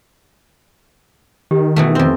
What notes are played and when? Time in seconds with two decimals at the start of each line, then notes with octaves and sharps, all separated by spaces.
1.51 D#3 G4
1.76 B2 E3 A3 C#4 F4
1.95 F2 C4